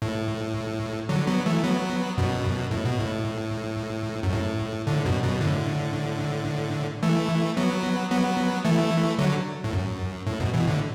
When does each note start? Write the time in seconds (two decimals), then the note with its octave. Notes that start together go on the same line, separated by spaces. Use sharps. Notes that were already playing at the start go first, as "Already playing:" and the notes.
0.02 A2
1.09 D3 F#3
1.27 F#3 B3
1.46 E3 A3
1.64 F#3 B3
2.18 F#2 B2
2.71 A2
2.85 B2
2.99 A2
4.23 F#2
4.33 A2
4.87 A2 D3
5.05 F#2 B2
5.23 F#2 B2
5.41 A2 D3
7.03 E3 A3
7.57 F#3 B3
8.11 F#3 B3
8.65 E3 A3
9.18 D3 F#3
9.64 A2
9.73 F#2
10.27 A2
10.40 F#2 B2
10.54 B2 E3
10.67 A2 D3